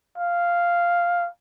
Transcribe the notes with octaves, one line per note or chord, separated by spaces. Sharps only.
F5